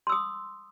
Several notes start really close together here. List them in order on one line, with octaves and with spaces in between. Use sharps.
C6 E6 D#6